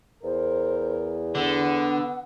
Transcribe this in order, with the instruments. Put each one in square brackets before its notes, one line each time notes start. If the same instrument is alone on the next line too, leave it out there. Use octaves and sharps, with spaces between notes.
[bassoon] E2 [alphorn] A#4 [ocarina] C5
[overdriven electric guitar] D3 [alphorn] B3 [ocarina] F#5